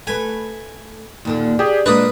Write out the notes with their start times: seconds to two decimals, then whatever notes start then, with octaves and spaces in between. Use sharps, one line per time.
0.07 A3 B4 G#5
1.25 D#2 A#2 D3
1.59 D4 G4 G#4
1.86 A#2 G#3 A#3 D4 B4 B5 D#6